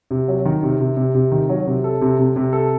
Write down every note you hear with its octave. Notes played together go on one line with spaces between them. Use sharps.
C3
F#3
D#3
C3
C3
C3
C3
D#3
F#3
C3
A4
C3
C3
C3
A4